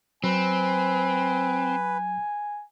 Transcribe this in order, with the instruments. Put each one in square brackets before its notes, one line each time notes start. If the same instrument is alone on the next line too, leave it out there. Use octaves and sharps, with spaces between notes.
[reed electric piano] F#3 [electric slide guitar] C4 [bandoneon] B4 [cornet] G#5